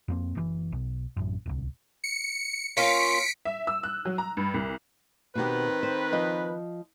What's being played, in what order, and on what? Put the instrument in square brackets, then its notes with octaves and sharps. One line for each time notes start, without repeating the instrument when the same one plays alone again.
[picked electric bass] F2 A#3 C4
F#1 C3 E3
B1
A1 F#2
D1 C2
[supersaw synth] C#7
[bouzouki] A#3 C#4 F4 [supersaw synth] B6 C#7 D7
[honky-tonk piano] E5
E6
F#6
F#3
A#5
G2
C2
[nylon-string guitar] B2 B3 G4 [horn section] D#3 C4 B4
[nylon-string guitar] C5
F3 D#5